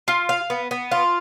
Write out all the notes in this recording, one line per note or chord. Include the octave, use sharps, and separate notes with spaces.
F4
F5
B3
B3
F4